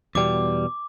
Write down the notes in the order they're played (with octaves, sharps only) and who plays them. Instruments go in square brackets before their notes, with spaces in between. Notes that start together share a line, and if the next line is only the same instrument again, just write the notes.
[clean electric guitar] E2 B2 G3 [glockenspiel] D6